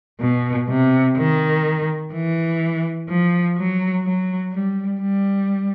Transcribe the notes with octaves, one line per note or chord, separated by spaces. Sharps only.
B2
C3
D#3
E3
F3
F#3
F#3
G3
G3